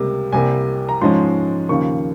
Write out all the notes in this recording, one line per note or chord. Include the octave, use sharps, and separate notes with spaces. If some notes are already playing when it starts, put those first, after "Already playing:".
Already playing: C#2 C3 G3 A#3
C2 C3 G3 A#3 G#5
A#5
G#2 F3 G#3 C#4 C6
D#2 C#3 F3 A#3 C#6